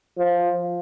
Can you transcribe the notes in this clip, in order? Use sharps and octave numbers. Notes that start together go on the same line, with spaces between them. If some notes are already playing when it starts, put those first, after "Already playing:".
F3